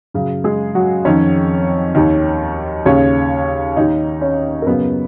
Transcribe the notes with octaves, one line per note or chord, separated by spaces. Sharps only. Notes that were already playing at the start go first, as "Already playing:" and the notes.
F#2 C#3
G#3 G#4
F#3 F#4
F2 D#3 C#4 C#5
D#2 D#3
D#2 C#3 C#4 C#5
D#2 D#3 D#4 D#5
C#4 C#5
A#4
F#2 C#3 B3 B4